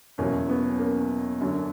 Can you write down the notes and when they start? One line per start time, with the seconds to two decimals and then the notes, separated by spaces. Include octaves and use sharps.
0.18 E2 B2 F#3 A#3 C#4
0.49 B3
0.80 A#3 C#4
1.41 F#2 D3 F#3